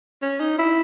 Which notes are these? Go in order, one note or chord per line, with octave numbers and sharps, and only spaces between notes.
C#4
D#4
E4